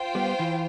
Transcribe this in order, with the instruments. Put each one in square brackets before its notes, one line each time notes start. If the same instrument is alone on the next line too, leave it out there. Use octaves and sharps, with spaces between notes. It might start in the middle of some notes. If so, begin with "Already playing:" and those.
Already playing: [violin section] F4 C5 G5
[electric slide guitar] G3 B3
E3